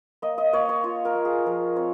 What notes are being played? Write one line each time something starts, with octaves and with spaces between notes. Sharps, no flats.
A#3 D#5
D#5
A#3 C#5
C#5
F4 C#5
A#4
A#3
G#4
F3 A#4
C4 C#5